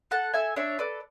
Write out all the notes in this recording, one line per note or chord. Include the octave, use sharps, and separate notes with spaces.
A4 F#5 A5
A4 E5 G#5
D4 C#5 E5
A4 B4 D5